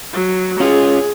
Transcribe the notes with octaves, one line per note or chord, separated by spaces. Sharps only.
F#3
C#4 F4 G#4